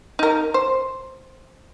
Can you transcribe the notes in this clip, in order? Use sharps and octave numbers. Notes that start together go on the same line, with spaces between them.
D#4 A#4
C5